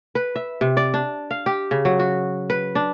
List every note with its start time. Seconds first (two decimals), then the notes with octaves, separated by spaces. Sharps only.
0.15 B4
0.36 E5
0.61 C3
0.77 D5
0.94 D4
1.31 F5
1.46 G4
1.71 C#3
1.85 F#3
2.00 F#4
2.50 B4
2.75 D4